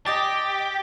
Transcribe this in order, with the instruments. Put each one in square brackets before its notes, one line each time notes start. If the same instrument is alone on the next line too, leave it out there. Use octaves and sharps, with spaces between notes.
[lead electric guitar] G4 [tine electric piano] D#5 D6 A6